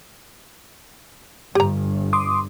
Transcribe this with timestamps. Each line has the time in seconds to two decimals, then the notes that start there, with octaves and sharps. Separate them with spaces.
1.55 G1 G2 G4 A#5
2.13 C6 D6 D#6